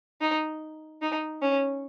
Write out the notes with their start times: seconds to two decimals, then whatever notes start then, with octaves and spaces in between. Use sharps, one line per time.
0.21 D#4
1.02 D#4
1.42 C#4